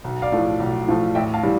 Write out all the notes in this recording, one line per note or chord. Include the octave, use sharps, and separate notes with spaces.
B1
D5 F5
A2 F3 A3
B1
A2 F3 A3
A1 E5 G5
F5 A5
A2 E3 G3